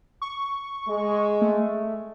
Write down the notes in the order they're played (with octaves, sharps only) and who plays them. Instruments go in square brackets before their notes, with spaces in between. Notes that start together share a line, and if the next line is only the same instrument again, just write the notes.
[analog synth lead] C#6
[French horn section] G#3
[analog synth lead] A3